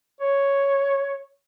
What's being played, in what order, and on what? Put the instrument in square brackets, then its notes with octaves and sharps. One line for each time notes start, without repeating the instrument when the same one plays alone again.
[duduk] C#5